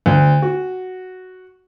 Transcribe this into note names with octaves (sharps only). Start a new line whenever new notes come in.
D2
F#4